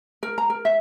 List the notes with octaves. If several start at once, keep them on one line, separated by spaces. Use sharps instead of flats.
A#4
A#5
A#4
E5